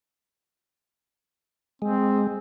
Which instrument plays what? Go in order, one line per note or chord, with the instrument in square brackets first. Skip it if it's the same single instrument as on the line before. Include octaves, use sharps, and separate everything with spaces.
[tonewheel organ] G#3 [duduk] C4